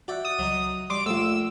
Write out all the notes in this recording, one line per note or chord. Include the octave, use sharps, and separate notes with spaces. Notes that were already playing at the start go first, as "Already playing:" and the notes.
F#4 D5 E5 F#5 G5
D#6
C#2 F#3 D#4
G3 C6 D6
A#1 A3 F4 E6